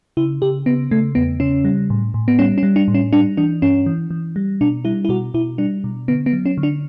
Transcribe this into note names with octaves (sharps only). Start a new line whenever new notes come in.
C#3 E4
C#3 G4
C#3 B3
C#3 A3
E2 B3
C#3 C#4
G3
A2
A2
B3
G3 C#4
C#4
G3
D4
A2
C#4
G3 D4
E3 D4
G2 C#4
E3
E3
G3
B2 D4
G3 E4
E4
B2 F#4
B2 E4
G3 D4
B2
D3 B3
B3
F#3
C#4
D3
D4